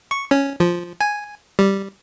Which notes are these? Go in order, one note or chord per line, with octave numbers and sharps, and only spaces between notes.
C#6
C#4
F3
G#5
G3